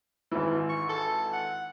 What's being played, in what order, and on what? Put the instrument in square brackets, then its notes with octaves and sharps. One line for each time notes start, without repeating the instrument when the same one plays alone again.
[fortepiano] G#1 E3
[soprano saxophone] C#6
A4
F#5